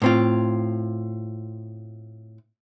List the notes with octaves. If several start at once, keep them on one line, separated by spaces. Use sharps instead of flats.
A2 C4 F4